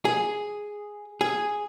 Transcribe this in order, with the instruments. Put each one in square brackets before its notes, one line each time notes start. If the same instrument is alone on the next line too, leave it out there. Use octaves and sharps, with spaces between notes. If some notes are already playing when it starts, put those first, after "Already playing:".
[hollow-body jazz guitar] G#4
G#4